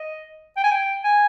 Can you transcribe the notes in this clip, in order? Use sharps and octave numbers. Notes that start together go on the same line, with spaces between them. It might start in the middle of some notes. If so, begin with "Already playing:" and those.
Already playing: D#5
G5
G#5
G5
G#5